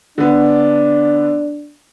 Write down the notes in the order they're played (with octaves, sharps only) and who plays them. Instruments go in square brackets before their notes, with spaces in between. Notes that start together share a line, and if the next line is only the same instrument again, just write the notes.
[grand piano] D3 B3 [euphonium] D4